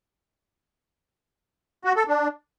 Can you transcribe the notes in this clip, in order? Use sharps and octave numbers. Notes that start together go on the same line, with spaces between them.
F#4
A4
D4